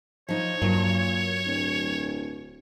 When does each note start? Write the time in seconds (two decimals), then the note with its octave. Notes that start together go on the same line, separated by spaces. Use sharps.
0.29 F3 D#4 C#5
0.62 G2 A#2 F#3
1.46 D1